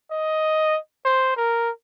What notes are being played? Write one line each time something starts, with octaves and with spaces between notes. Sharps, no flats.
D#5
C5
A#4